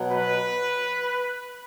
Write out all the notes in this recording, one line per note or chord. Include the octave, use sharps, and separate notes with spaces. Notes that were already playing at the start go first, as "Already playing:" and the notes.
Already playing: B2 F#3
B4